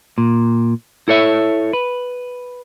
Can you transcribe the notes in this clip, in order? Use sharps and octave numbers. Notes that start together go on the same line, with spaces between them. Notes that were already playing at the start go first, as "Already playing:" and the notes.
A#2
E4 A4 C#5 E5
B4